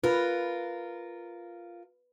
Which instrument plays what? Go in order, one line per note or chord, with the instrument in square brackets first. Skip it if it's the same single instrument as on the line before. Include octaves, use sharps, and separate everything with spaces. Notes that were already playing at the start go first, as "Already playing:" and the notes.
[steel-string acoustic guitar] F4 A#4 [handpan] B4